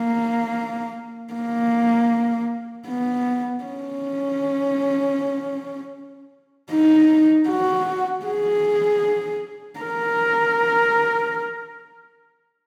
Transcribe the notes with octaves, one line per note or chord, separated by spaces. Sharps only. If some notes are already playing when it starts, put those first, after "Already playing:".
Already playing: A#3
A#3
B3
C#4
D#4
F#4
G#4
A#4